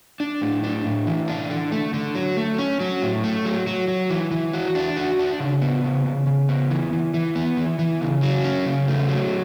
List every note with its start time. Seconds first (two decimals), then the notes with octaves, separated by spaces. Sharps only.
0.20 D4
0.42 A2
0.64 D4
0.86 A2
1.07 E3
1.28 D4
1.50 D3
1.72 A3
1.94 D3
2.15 F#3
2.37 A3
2.59 C#4
2.80 F#3
3.02 A2
3.24 A3
3.45 F#3
3.67 F#3
3.88 F#3
4.10 E3
4.31 E3
4.53 F#4
4.75 D4
4.97 F#4
5.19 D4
5.40 C#3
5.62 B3
5.84 C#3
6.06 C#3
6.27 C#3
6.49 B3
6.71 E3
6.93 E3
7.14 E3
7.35 B3
7.57 E3
7.79 E3
8.01 C#3
8.22 F#3
8.44 C#4
8.66 C#3
8.88 A3
9.09 F#3